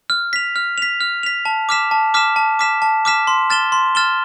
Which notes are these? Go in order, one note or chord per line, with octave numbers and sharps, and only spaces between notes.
F6
B6 F7
F6
B6 F7
F6
B6 F7
A5
D6 F6 B6 E7
A5
D6 F6 B6 E7
A5
D6 F6 B6 E7
A5
D6 F6 B6 E7
C6
F6 A6 E7 G7
C6
F6 A6 E7 G7